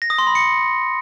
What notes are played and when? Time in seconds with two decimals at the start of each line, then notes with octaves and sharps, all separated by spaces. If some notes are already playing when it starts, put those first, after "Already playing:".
0.02 A#6
0.10 D#6
0.18 C6
0.27 B5
0.35 C#7